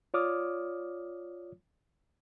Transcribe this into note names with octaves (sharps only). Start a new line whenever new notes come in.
F4 C#5 D5 D6 D#6 F6